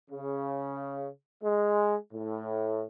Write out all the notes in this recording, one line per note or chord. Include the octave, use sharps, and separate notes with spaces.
C#3
G#3
A2